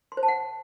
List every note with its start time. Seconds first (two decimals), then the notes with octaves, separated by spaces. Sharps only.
0.12 C6
0.17 C5
0.23 A5
0.28 F#5